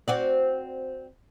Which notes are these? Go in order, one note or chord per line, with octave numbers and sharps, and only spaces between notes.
C4 F#4 D5